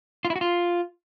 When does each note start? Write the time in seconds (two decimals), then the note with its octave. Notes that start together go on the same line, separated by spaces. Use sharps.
0.25 F4
0.30 E4
0.36 F#4
0.41 F4